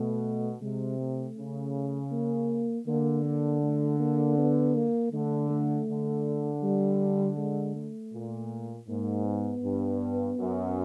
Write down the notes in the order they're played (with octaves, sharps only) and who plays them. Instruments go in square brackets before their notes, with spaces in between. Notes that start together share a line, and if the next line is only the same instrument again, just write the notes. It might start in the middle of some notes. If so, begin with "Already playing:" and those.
Already playing: [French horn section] B2 [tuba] A3
[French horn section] C3 [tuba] G#3
[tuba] A3
[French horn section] C#3
[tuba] A#3
[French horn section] D3 [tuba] A#3
[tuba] A#3
A3
A#3
B3
A#3
[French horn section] D3 [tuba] A3
[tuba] A3
[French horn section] D3
[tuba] G3
G#3
A3
[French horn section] A#2
[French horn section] G#2 [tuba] A#3
[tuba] B3
[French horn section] G2
F#2